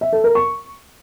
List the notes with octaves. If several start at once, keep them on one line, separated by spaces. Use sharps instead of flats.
E5
A4
A#4
C#6